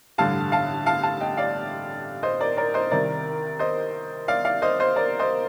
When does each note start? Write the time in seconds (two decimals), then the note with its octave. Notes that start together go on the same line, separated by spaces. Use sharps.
0.18 A1 G2 D3 F5 A5
0.52 F5 A5
0.86 F5 A5
1.03 F5 A5
1.20 D#5 G5
1.37 D5 F5
2.23 C5 D#5
2.40 A#4 D5
2.57 A#4 D5
2.74 C5 D#5
2.91 C2 C3 D#3 A#4 D5
3.59 C5 D#5
4.28 D5 F5
4.45 D5 F5
4.62 C5 D#5
4.80 C5 D#5
4.96 A#4 D5
5.19 C5 D#5